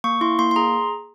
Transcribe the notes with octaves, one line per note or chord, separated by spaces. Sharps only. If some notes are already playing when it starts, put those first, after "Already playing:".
A#3 C#6
E4 C6
A#3 C6
C6
G#4 A#5